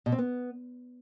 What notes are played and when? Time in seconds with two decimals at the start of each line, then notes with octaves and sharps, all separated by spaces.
0.06 B2
0.12 C4
0.18 B3